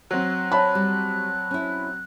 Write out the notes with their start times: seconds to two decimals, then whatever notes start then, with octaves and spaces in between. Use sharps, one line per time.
0.11 F#3 C4 F#6
0.52 C#5 A5 B5
0.75 G3
1.51 C#4 E4